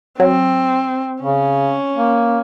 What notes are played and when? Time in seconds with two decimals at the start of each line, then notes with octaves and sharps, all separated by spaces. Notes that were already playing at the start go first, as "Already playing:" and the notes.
0.20 F#3 C4
1.22 C#3 C#4
1.96 A#3